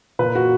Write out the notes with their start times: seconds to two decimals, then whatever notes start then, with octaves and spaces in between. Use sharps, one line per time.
0.19 A#2 B4
0.35 F#4